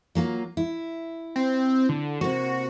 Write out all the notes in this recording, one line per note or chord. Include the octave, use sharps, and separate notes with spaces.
F#3 A#3 F4
E4
C4
D3
C3 A#3 F#4